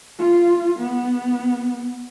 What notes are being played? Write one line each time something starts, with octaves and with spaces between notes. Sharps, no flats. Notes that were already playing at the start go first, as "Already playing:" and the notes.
F4
B3